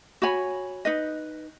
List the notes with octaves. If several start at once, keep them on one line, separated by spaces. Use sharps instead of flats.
F#4 C#5 G#5 B5
D#4 B4 D#5